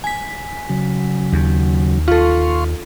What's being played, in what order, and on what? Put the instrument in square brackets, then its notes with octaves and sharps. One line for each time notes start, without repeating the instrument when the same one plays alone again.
[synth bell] G#5 B6
[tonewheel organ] C#3 F#3
[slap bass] D#2
[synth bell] F4 A4 [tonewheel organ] F5 C6 C#6